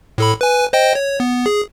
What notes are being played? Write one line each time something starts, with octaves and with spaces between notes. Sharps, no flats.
A2 A4 B5
B4 G#5
C5 D#5 G5
C#5
B3
G#4